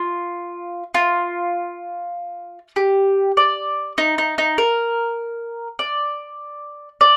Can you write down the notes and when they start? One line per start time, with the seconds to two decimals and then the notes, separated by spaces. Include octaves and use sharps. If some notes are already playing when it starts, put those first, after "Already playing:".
Already playing: F4
0.94 F4
2.76 G4
3.37 D5
3.98 D#4
4.18 D#4
4.38 D#4
4.58 A#4
5.79 D5
7.01 D5